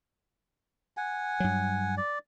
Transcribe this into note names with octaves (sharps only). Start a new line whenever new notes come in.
F#5 G#5
G2 F#3
D5